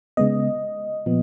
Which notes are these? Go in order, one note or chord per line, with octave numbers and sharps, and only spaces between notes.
C#3 G#3 B3 D#5
A#2 F3 B3